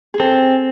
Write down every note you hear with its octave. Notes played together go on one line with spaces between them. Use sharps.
G#4
C4 A4